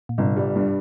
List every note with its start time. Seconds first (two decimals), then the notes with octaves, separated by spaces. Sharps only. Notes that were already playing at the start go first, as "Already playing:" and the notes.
0.09 A#2
0.18 G1 G#2 C3
0.36 G3
0.55 G2